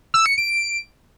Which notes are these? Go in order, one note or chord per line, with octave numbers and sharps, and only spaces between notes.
E6
C#7
D7